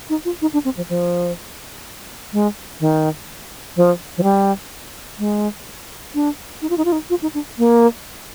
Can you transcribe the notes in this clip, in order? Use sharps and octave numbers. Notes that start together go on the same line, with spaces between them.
D#4
F4
D#4
D4
C4
F3
F3
G#3
D#3
F3
F3
G3
G#3
D4
D#4
F4
D#4
F4
D#4
F4
D#4
D4
A#3